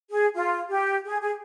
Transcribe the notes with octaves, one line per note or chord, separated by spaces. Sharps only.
G#4
F4
G4
G#4
G#4